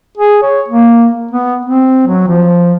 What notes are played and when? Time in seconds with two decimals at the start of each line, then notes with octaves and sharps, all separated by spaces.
0.18 G#4
0.43 C#5
0.68 A#3
1.31 B3
1.66 C4
2.07 F#3
2.28 F3